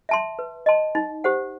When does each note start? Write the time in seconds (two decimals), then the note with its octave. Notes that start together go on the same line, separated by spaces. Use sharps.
0.09 E5 A5 C6
0.39 B4
0.66 D#5 A5 C6
0.95 D#4
1.24 G4 C5 F#5